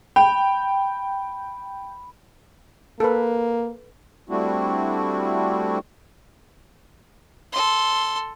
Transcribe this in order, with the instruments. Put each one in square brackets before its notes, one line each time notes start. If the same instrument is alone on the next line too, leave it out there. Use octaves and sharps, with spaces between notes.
[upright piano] G5 [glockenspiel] B5
[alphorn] A#3 [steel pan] A4 B4
[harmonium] G3 A3 C4 D4 E4 F#4
[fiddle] A4 C6